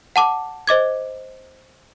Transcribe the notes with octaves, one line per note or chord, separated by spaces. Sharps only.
F#5 A5 D6
C5 D#5 D6 G#6